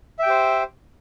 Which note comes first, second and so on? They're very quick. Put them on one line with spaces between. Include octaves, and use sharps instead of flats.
E5 G5 G4 C5